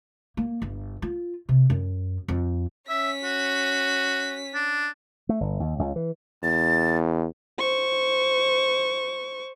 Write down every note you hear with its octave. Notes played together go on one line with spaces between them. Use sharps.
A#3
G1
F4
C3
F#2
F2
C#4 E5 B6
F#4
D4
A3
G1
D#2
C#2
E3
E2 A6
C5 C#6